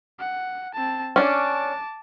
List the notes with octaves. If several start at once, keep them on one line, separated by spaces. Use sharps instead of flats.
F#5
C4 A5
C#4 D4 A5 D6